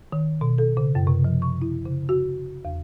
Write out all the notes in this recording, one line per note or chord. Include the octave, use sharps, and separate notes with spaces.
D#3
B2
A4
C#3
F#2
C3
F3
C#6
E4
C#3
F#4
E2